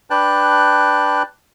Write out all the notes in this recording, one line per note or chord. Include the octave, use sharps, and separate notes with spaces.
D4 B4 G5 A5 F#6